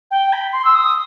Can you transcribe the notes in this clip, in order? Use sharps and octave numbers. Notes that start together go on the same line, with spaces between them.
G5
B5
C6
E6
D#6